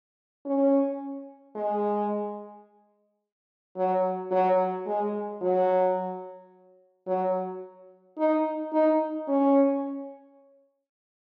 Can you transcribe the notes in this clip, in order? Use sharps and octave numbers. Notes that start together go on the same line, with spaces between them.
C#4
G#3
F#3
F#3
G#3
F#3
F#3
D#4
D#4
C#4